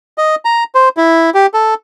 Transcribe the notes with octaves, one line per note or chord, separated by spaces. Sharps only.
D#5
A#5
C5
E4
G4
A4